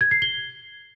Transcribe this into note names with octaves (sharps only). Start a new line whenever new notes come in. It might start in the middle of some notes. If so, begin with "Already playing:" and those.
G#6
C7
G7